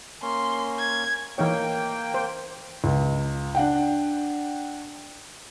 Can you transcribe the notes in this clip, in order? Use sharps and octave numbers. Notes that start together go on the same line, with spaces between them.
A#3 C#4 C6
G#6
E3 A#3 D#4 C#5 G5
C5
C#2
D4 F#5 G5